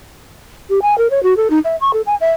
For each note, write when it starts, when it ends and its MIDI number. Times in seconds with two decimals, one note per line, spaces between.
0.70 0.79 67
0.82 0.97 80
0.98 1.07 70
1.10 1.23 73
1.23 1.36 66
1.37 1.48 69
1.50 1.59 63
1.64 1.76 76
1.81 1.91 85
1.93 2.01 69
2.06 2.15 80
2.21 2.31 76